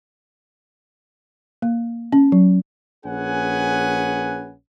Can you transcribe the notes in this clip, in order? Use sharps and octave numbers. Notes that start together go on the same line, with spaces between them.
A#3
C#4
F#3
A#1 C#4 G#4 B4 F#5 G#5